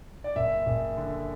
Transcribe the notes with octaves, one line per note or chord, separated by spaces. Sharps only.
D5
F#1 E5
F#1
D3